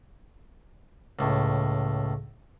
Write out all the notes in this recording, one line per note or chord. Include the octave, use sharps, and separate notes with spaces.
C#2 A2